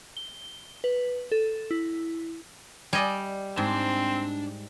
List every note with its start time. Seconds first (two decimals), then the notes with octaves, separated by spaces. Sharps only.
0.17 G7
0.84 B4
1.32 A4
1.71 E4
2.93 G3 D5 D#5 G#5
3.57 G#2 C4 D4 A5